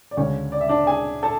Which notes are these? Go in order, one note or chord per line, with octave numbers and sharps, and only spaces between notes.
D5
D2 C#3 G#3 C#4 C#5
D5
E5
D4 D5
G#4 G#5
A4 A5